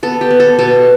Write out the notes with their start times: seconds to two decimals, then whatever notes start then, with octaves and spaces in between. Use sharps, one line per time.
0.03 B3 A4
0.21 G4
0.30 B3
0.40 A4
0.59 B2 A4